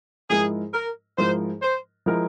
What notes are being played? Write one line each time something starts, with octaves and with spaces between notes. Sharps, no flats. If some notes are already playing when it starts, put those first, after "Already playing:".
G#2 F3 G#3 E4 G#4 A#4
A#4
G#2 F3 G#3 E4 A#4 C5
C5
F3 G#3 E4 A#4